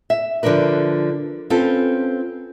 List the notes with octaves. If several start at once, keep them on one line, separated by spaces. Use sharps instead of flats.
E5
D3 F3 D4 A#4 B4
C4 C#4 F4 A4 B4